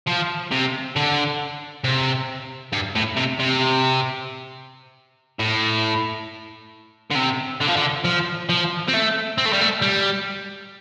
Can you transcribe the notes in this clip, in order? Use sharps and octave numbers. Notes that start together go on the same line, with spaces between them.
F3
C3
D3
C3
G2
A2
C3
C3
A2
D3
C3
D3
F3
D3
F3
F3
C4
A3
C4
A3
G3
A3
G3